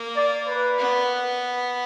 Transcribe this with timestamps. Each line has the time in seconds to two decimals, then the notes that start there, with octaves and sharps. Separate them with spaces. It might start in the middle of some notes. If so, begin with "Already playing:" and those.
Already playing: A#3
0.16 D5
0.47 B4
0.78 B3